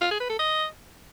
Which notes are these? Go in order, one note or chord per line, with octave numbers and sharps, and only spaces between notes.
F4
G#4
B4
A4
D#5